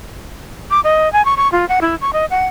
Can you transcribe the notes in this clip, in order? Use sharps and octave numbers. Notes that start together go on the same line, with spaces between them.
D6
D#5
G#5
C#6
C#6
F4
F#5
E4
C#6
D#5
F#5